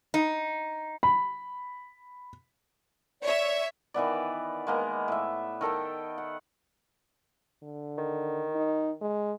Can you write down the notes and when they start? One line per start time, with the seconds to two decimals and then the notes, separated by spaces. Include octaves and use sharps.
0.14 D#4
1.03 B5
3.22 C#5 D5 E5
3.94 D#3 E3 B3 D5
4.67 G#3 A#3 B3
5.08 A2 E5
5.61 D#3 A4 D#5 G5
6.18 F#5
7.63 D3
7.98 D#3
8.55 D#4
9.01 G#3